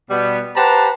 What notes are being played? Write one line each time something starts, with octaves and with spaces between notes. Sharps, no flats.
B2 G3 B3
G4 B4 C5 F#5 A5 A#5